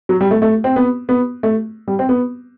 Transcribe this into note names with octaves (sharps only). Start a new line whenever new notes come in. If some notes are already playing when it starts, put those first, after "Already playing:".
F#3
G3
A3
A3
C4
B3
B3
A3
G3
C4
B3